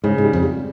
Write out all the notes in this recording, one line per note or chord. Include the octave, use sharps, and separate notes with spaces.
G#2 C#3
G#2
G3
F2
G3